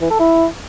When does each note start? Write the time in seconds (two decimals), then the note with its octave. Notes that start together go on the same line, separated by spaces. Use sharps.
0.01 E3
0.10 A4
0.20 E4